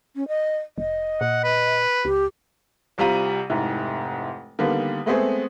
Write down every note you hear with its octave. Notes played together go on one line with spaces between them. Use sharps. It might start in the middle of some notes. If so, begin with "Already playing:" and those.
C#4
D#5
F1 D#5
A#2 F#5
B4
C#2 G4
C2 C3 G3 F4 A#5 D#7
F1 G#2 E4
D3 D#3 G3 A#3 B3
G#3 A3 B3 C4 G#4